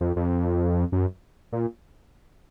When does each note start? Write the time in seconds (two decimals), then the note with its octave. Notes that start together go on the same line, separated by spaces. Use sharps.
0.01 F2
0.16 F2
0.92 F#2
1.53 A#2